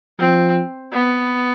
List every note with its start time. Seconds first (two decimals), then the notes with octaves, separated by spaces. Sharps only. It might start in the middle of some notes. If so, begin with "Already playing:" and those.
0.19 F3 C4
0.92 B3